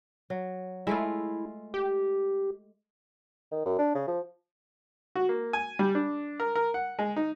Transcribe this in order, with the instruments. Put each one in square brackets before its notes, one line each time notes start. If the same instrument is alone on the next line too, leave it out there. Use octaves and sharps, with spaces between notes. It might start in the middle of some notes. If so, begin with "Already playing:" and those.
[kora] F#3
[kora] G#3 A3 F4 [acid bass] E4
[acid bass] G4
[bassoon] D#3
F#2
D4
C#3
F3
[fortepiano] F#4
A#3
G#5
G3
D4
A#4
A#4
F#5
G#3
D#4